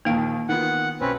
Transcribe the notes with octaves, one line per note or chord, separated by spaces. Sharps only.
A#1 D#2 D#3 A#3 F5
D#3 B3 F4 F#5
B1 C4 C#4 B4